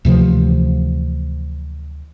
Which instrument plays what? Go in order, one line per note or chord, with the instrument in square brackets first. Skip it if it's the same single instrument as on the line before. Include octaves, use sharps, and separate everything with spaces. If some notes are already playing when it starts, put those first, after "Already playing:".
[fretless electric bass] D2 C3 E3 F3